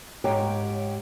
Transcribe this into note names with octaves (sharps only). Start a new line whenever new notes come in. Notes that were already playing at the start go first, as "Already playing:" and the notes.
G#2 G4 C#5 G5 A#5